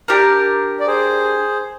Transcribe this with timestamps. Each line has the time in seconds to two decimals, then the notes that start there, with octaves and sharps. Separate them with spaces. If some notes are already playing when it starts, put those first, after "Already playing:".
0.08 D4 G4 A#4
0.80 D5
0.87 G#4 C5